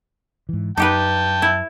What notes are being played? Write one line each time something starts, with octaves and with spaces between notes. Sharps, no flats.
G#2 E3
F#2 D#4 G4 B4 G5 A5
E4